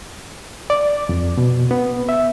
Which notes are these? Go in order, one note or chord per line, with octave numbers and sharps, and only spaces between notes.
D5
F2
B2
B3
E5